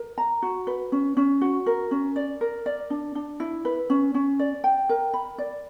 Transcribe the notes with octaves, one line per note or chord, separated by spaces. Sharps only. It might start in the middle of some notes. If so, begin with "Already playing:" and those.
Already playing: A#4
A#5
F#4
B4
C#4
C#4
F#4
A#4
C#4
D5
A#4
D5
D4
D4
E4
B4
C#4
C#4
D5
G5
A#4
B5
D5